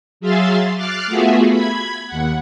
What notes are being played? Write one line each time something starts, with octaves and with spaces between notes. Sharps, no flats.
F#3 G#4 E5 F5 C6 A6
D6 F6 F#6 A6 C7
A3 B3 F4 F#4 G#4 E5
B5 G#6
D#2 F#5